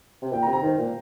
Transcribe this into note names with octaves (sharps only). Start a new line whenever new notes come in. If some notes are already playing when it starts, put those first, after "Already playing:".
C3
A#2 G5
A#5
C3
A#5
D#3 C5
A#2